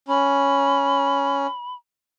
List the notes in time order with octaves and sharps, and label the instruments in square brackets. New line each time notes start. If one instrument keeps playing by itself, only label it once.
[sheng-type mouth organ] C#4 [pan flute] B5